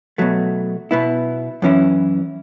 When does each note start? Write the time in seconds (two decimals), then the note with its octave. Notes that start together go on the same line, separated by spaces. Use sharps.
0.18 B2 F#3 A3
0.91 B2 B3 E4
1.62 F#2 E3 C#4 E4